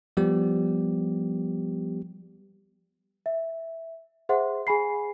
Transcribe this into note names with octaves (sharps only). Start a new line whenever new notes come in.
F3 G3 B3 G4
E5
G#4 C5 E5 F#5 C6
G#4 G#5 B5 C7